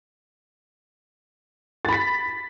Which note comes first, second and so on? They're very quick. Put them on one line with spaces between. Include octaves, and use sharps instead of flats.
A6 B5 B6